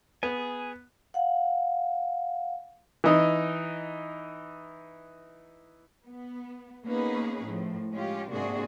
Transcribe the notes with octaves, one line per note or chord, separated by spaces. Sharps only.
B3 G#4 G#5
F5 F#5
E3 D#4 D#5
B3
A#3 B3 C#4 D#4 G#4 B4
A2 F3
G#3 C#4 F4 G4
G#2 C3 A#3 D4 F#4 G#4